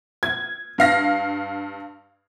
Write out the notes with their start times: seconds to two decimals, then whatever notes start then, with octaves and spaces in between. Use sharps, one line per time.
0.23 G#6
0.78 G2 F5 A#6